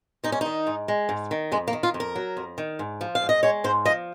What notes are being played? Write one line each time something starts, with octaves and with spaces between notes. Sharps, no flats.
G#2 D#4
C#4
D#3 D#4
G#2
G#3
G#2
D#3
F2 G#3
A#3
D#3
F4
F2
A#4
F#3
F2
D#3
G#2
F3
F5
G#2
D#5
G#3 C#5
G#2 C5
F3 D#5